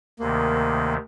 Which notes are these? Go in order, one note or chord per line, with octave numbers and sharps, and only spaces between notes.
D2 C3 D#3 A#3